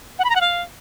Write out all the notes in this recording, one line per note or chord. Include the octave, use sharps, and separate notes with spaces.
F#5
B5
A#5
F#5
F5